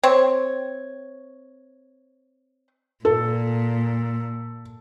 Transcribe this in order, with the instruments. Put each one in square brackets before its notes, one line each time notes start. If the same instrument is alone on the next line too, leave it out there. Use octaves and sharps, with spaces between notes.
[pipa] C4 C#5
[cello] A#2 [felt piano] A4